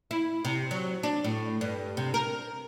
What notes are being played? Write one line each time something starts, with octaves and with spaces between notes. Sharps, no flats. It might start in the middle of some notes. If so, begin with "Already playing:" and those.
E4
C3
F#3
D4
A2
G2
C3
A#4